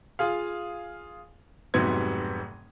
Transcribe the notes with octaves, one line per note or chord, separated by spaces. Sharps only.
F4 G#4 F5
F1 G#2 C3 F#3 B3 G#6